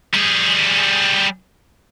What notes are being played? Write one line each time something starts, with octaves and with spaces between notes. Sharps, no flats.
G3 G#4